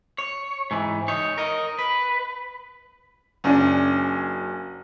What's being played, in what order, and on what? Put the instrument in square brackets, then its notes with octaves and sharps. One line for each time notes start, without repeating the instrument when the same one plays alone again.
[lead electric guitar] C#5
G#2 E3
D#4 C#5
A#4 D#5
B4
[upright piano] F#1 C#4 D4